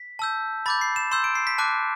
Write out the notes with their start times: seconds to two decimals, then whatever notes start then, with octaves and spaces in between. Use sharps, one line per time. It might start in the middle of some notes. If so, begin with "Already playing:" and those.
Already playing: B6
0.19 A5 E6 G6
0.66 B5 D6 G6 A6
0.81 C7
0.96 E7
1.11 C6 E6 G6 E7
1.24 D7
1.35 C7
1.47 B6
1.58 A5 D6 F#6